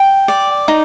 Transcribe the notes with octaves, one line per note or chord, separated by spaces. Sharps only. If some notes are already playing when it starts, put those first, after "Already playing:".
Already playing: G5
D5
D#4